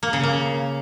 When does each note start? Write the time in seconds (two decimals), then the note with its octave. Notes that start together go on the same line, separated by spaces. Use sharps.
0.03 A#3
0.13 C#3
0.23 A#3